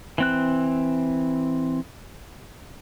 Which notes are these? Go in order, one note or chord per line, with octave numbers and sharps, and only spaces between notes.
E3 C4 F#6